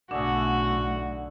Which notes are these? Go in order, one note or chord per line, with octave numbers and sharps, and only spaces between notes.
B1 A2 D3 D4 F#4 G#4 E5